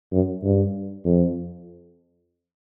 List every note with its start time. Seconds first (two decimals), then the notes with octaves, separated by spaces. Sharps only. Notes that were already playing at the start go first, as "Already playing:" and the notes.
0.12 F#2
0.43 G2
1.05 F2